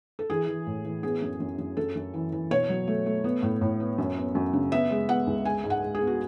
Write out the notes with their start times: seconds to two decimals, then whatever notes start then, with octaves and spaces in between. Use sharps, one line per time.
0.19 A4
0.30 E3 G#4
0.48 E3
0.67 A2
0.85 E3
1.03 B3 G#4
1.22 F#2
1.40 F#2
1.58 F#2
1.77 F#2 A4
1.95 F#2
2.14 E3
2.32 E3
2.51 B2 C#5
2.69 F#3
2.88 A3
3.06 A3
3.24 B3
3.43 A2
3.61 A2
3.80 B3
3.98 F#2
4.17 B3
4.35 F#2
4.53 C#3
4.72 B3 E5
4.90 G#3
5.09 B3 F#5
5.27 C#2
5.45 G#3 G#5
5.64 G#2
5.70 F#5
5.82 G#3
5.95 G#4
6.01 B3
6.07 F#4